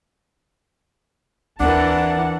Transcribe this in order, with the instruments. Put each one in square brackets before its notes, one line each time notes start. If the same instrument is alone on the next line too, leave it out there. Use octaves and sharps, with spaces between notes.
[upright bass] D#2 C4 [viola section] E3 A#4 A5 [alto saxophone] D4 [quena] F#5